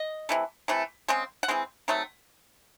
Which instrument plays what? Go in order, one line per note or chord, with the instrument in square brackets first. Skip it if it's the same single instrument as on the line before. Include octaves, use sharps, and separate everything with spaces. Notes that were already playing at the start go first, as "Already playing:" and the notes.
Already playing: [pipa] D#5
C3 E3 A3
C3 E3 A3
C#3 G#3 C4
F#5
E3 G#3 C4
D#3 F#3 A3 C4